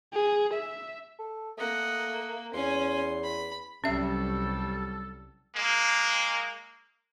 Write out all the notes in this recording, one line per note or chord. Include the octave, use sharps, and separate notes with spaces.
G#4
E5
A4
A3 A#3 D#5 F#5
E2 C#4 G#5 C6
B5
C2 F#3 G3 C#4 A4 E5
G#3 A#3